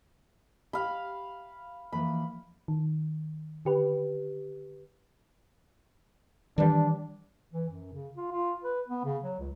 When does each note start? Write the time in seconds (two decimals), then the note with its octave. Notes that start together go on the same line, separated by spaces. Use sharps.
0.73 G4 F5 B5
1.92 E3 F3 A#3 B5
2.68 D#3
3.65 D3 G4 B4
6.58 D#3 E3 G3 D4
7.53 E3
7.70 F#2
7.93 C#3
8.17 F4
8.32 F4
8.64 B4
8.88 B3
9.04 C#3
9.24 F#3
9.39 C#2